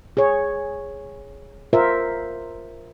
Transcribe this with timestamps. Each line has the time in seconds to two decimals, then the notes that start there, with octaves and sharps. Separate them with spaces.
0.17 G#4 C#5
1.73 F4 A#4 C5 E5